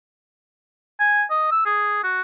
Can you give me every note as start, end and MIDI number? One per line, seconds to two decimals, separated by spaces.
1.00 1.24 80
1.31 1.47 75
1.52 1.61 88
1.66 2.03 68
2.04 2.22 66